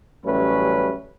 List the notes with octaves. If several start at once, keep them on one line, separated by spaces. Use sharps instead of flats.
A1 F#3 G3 A3 C#4 B4